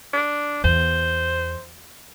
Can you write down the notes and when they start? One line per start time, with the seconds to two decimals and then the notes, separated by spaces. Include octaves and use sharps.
0.13 D4
0.64 E2 C5